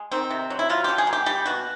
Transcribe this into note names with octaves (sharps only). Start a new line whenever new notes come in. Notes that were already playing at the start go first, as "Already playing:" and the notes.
Already playing: G#3
D#3 C4
C3
F#3
E4
F#3 F4
D3 G4
G#4
A#3
G4
G3 G4
B2 F#4